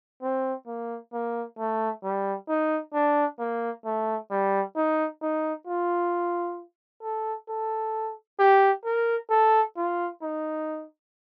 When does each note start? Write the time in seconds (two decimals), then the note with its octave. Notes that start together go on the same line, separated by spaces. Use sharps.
0.22 C4
0.67 A#3
1.13 A#3
1.58 A3
2.03 G3
2.49 D#4
2.94 D4
3.39 A#3
3.85 A3
4.30 G3
4.76 D#4
5.22 D#4
5.67 F4
7.03 A4
7.49 A4
8.39 G4
8.85 A#4
9.30 A4
9.77 F4
10.22 D#4